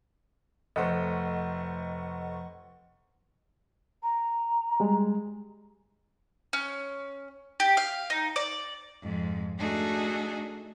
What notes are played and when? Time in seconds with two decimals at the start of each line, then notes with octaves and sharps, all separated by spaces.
0.76 F1 A3 C5 D#5 F#5 C#6
4.03 A#5
4.80 G3 G#3
6.53 C#4
7.60 G4
7.77 F5
8.10 D#4
8.36 D5
9.01 F2 G#2
9.59 A3 D4 D#4 F#4 G#4 A4